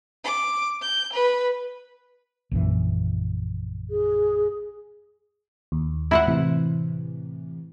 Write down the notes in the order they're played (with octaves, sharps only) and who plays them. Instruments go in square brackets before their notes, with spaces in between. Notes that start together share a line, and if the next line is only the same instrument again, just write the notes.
[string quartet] D6
G6
B4
[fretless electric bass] A#1 F#2 E3
[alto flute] G#4
[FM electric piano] D#2
[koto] E4 C5 F#5
[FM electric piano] A2 C3 E3